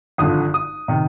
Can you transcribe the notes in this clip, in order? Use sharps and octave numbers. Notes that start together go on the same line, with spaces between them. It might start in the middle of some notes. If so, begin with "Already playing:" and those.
G#1 G2 D3 F3 D#6
D#6
C3 D#3